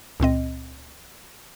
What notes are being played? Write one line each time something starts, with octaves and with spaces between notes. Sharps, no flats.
C#2 A#2 C4 D#5